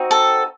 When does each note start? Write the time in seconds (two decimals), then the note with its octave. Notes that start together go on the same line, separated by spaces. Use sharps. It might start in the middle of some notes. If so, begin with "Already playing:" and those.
Already playing: C4 D#4 F#4
0.11 A4